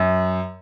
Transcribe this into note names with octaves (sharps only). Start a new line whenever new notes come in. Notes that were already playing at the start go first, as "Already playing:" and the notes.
Already playing: F#2